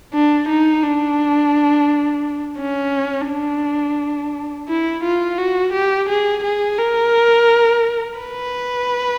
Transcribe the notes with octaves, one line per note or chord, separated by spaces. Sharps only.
D4
D#4
D4
C#4
D4
E4
F4
F#4
G4
G#4
G#4
A#4
B4